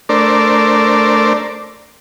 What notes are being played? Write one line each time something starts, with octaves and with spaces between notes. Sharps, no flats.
A3 D4 A#4 C5 D5